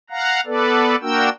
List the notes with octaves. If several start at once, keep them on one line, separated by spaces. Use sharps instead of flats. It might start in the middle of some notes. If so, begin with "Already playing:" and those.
F5 F#5 A#5
B3 A4 B4 D5
A#3 D4 F#4 A#4 G5 E6